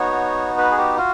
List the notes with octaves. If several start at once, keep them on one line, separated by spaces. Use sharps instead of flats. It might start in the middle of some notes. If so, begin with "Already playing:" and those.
Already playing: B3 D#4 F#4 C#5
B4
G#4
G4
F4 F#4